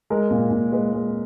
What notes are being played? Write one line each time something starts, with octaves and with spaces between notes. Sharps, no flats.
G#3 A#4
A#2
A#2
G#3 B4
G#3